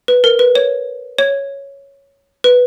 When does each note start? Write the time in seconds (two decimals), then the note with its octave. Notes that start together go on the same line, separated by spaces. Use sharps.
0.08 B4
0.24 A#4
0.39 B4
0.55 C#5
1.18 C#5
2.44 B4